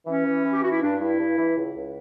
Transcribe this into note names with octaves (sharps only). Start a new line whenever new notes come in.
E3 C#4
E3
E3
G4
E3 F#4
E4
G2 D4
G2 E4
G2
E3
C#2
C#2